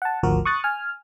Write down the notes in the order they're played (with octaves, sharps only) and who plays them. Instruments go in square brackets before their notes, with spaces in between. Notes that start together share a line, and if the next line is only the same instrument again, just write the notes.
[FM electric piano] F#5 A5
G#1 D2 F3 F#4 A#4
C#6 D#6 F#6 A6 C#7
G#5 F6